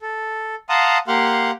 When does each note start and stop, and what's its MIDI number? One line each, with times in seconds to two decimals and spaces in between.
0.01 0.55 69
0.69 0.98 77
0.69 0.98 78
0.69 0.98 81
0.69 0.98 82
0.69 0.98 84
0.69 0.98 87
1.08 1.51 58
1.08 1.51 67
1.08 1.51 77
1.08 1.51 78
1.08 1.51 84